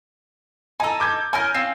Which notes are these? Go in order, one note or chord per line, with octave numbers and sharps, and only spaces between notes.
D#4 A4 G#5 A#5
D6 G6 G#6
C#4 A#4 G#5 F6 G6
C4 C#4 F4 C7